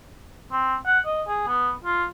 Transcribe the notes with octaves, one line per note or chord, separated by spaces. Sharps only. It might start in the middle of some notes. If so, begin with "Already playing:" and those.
C4
F#5
D#5
G#4
B3
F4